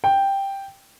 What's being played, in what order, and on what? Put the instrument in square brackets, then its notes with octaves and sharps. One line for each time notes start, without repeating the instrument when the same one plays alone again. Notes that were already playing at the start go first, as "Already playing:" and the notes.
[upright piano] G5